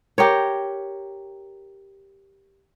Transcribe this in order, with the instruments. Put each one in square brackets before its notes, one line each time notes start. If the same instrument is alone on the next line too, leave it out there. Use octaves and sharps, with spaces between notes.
[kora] G4 A#4 C#5